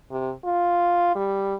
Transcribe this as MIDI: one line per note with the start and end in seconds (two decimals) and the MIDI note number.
0.11 0.32 48
0.45 1.14 65
1.15 1.55 55